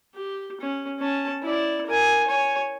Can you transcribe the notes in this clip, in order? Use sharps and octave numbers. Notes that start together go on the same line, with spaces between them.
G4
C#4
C#4 A5
E4 D5
A#4 G#5
C#5 G#5